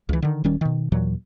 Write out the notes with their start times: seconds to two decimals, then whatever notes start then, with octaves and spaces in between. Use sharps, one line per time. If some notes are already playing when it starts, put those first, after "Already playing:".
0.09 C#2 E3
0.22 D3 D#3
0.44 D#1 D#3 G3 C#4
0.61 B2 D#3
0.92 D#2 A#2 E3 F#3